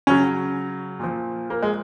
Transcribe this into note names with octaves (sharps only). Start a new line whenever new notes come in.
C#3 F#3 C#4
A#2 F3
A#3
G#3